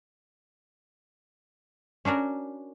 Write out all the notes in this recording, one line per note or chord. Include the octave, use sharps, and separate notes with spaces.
C#4 D4 F#4 A#4